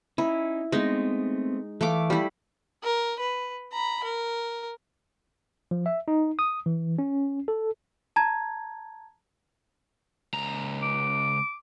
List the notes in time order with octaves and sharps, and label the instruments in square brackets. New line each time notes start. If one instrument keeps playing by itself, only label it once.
[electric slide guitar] C#4 D#4 [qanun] E4
[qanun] G#3 D#4 [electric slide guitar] A3 B3 C4
[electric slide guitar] E3 [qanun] A3 F5 D6
[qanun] G3 E4
[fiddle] A#4
B4
A#5 B5
A#4
[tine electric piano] F3
E5
D#4
D#6
E3
C#4
A4
[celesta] A5 A#5 G#6
[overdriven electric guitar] C#2 A#5
[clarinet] D6